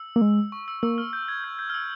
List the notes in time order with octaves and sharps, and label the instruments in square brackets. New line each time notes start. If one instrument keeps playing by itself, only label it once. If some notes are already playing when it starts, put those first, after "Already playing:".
Already playing: [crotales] E6
[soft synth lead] A#3
G#3
[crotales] C#6
E6
[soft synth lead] A#3 [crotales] E6
[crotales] F6
G6
G#6
G6
G6
F6
E6